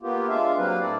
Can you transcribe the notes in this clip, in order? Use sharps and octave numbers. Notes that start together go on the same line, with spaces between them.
A#3 B3 F4 G4
G#3 D4 F4 E5 F5
F#3 G3 A#3 C4 B4 F5
A2 D4 E4 A#4 D5